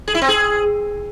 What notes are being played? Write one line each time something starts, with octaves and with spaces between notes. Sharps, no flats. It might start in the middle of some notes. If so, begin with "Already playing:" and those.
G#4
E4
C4
G#4